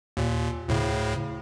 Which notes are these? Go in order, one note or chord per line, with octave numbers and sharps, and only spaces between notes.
D#2 A#2
D2 A2 C#3